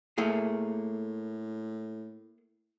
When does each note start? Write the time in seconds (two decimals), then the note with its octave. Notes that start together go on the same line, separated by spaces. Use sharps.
0.18 A2 A3 A#3 G#4